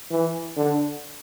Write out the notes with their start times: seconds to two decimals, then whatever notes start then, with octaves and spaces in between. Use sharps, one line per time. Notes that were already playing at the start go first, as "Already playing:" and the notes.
0.10 E3
0.56 D3